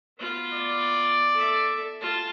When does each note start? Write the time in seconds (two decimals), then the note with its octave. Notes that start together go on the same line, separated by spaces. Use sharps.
0.19 B3 F4
0.53 D5
1.34 A4 E5
2.01 F4 A5